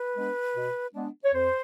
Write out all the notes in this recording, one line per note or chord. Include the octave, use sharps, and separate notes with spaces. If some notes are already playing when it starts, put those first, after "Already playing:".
Already playing: B4
G#3 B3 D4
B2
G#3 B3 D4
C#5
F2 C5